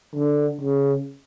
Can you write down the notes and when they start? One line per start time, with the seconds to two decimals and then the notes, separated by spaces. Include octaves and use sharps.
0.15 D3
0.61 C#3